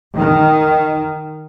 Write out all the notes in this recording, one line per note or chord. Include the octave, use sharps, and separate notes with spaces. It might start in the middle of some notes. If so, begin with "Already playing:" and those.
D#3